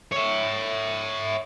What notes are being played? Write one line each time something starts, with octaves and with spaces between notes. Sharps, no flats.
C#5 E5